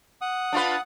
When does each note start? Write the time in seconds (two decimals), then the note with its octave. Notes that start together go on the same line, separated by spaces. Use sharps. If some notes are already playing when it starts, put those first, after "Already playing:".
0.21 F#5 D#6
0.52 D4 F4 B4